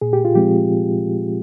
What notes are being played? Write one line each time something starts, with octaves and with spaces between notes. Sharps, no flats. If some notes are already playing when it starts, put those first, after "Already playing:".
A#2 G#4
G4
F4
F3 G#3 C4 G4